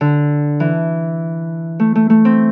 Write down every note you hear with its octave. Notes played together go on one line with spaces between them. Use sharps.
D3
E3
A3
A3
A3
C4